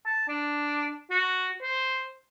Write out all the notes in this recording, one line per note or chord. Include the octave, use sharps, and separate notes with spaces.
A5
D4
F#4
C5